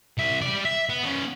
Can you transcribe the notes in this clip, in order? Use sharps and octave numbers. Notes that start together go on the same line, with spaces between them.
C2 E5
G3 D5
E5
B3
B3 C#4